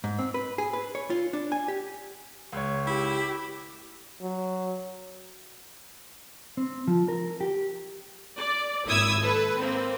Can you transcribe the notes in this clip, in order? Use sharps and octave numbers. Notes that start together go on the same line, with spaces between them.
G#2
C4
B4
G#4
B4
C#5
F4
D4
G#5
G4
C#2 C#5
E4 G4
F#3
C4
F3
A#4
G4
D5
G#1 A#3 E4 D#6 E6 G#6
A4 B4
A#3 C4